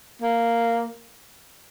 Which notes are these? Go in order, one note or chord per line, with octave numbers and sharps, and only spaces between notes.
A#3